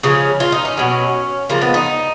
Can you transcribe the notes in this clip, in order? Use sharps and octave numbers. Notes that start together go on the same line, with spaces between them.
C#3 F3 G#3 C#4
F4
D#4
C#4
B2 F#3
C#3 F3 G#3 A#3
B3
D#4